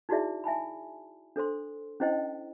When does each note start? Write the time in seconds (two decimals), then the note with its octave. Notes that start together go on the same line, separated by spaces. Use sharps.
0.09 D#4 E4 F#4 G#4 D5 E5
0.44 E5 G#5 A5 B5
1.36 D4 A4 C5 C6
2.00 C#4 D4 E4 C5 D#5 G5